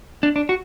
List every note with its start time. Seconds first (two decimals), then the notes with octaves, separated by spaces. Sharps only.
0.23 D4
0.36 D4
0.49 F#4